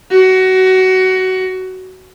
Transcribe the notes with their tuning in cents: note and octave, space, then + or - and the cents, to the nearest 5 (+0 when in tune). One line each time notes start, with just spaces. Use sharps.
F#4 +20